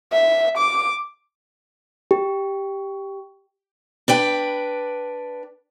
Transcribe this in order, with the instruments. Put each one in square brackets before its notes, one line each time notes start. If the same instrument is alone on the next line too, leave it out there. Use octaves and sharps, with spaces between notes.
[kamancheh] E5
D6
[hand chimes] G4
[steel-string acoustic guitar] D4 B4 G5